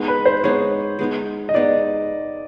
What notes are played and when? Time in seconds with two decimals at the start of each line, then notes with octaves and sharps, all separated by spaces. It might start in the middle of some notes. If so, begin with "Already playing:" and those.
Already playing: G#3 B3 D#4
0.08 B4
0.26 C5
0.44 G#3 B3 D#4 C#5
0.99 G#3 B3 D#4
1.49 D#5
1.54 G#3 B3 D#4 D5